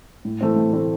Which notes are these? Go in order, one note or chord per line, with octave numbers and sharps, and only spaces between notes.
A2
E3 A3 C4
A2
E3 A3 C4